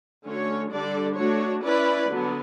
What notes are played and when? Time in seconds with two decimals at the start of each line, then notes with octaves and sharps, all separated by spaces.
0.25 D3 A3 C#4 F#4 C#5
0.71 D3 G3 D4 A4 D5
1.17 A3 D4 F#4 C#5
1.63 C#4 E4 B4 D5
2.09 D3 F#3 B3